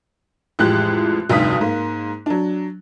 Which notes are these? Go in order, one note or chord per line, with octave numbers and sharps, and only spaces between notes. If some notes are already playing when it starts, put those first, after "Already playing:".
A1 F2 E3 G#3 G4 F#6
F1 D2 G2 D#4 D#6 B6
G#2 A#3
F#3 D4